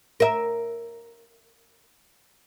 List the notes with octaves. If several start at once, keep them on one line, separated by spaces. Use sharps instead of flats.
A#4 E5